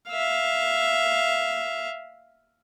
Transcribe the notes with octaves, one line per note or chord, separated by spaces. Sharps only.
E5 F5